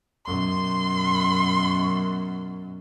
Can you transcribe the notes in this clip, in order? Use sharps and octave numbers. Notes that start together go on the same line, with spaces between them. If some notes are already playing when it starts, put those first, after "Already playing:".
F#2 B2 C6